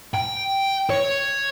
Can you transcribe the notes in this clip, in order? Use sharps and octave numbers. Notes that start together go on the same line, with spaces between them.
G5
C#5